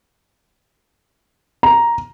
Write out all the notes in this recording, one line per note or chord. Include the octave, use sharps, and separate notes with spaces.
A#5